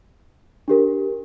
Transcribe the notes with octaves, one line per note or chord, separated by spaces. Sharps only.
D4 G4 A#4